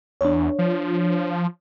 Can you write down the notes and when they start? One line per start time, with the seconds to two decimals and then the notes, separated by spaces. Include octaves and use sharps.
0.21 E2 D4 C#5
0.59 F3